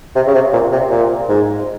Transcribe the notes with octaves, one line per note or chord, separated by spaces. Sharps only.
C3
C#3
C3
A#2
C3
A#2
G#2